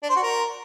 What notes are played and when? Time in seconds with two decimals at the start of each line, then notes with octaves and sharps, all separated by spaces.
0.03 D4
0.10 C5
0.16 F#4
0.23 A#4